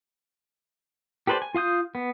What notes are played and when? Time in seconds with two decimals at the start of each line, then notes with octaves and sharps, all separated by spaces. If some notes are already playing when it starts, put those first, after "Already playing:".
1.27 G4 A4 B4 C5 D5
1.42 G#5
1.55 F4 F5 D#6 G6
1.95 B3